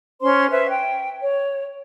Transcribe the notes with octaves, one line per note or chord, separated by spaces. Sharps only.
C#4 C5 C6
B4 C5 E5
G5
C#5